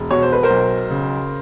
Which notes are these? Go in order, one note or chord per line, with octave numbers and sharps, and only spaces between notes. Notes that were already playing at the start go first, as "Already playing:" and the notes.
Already playing: E1
B2 C#5
C5
B4
A#4 C5
B1
C#3